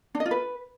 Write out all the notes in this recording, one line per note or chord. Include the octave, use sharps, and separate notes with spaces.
D4
D#5
F4
B4